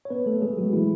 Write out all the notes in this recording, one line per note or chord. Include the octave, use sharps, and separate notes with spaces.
C#5
B3 B4
A3 A4
G#3 G#4
F#3 F#4
E3 E4